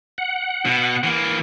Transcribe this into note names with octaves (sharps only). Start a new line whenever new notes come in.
F#5
B2
E3 A#3